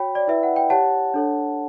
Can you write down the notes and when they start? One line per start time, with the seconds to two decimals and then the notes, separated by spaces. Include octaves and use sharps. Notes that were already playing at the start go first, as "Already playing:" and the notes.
Already playing: F#4 C#5 G5 B5
0.15 D5
0.27 E4 B4 D5 E5
0.43 F#5
0.56 G5
0.70 G4 C#5 F#5 A5
1.14 D4 A4 C#5